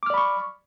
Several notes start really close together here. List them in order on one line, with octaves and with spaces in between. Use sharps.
D6 F6 D5 B5 C#6